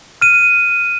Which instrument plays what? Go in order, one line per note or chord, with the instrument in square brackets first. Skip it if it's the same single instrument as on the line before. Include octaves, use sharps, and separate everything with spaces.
[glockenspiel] F6 D#7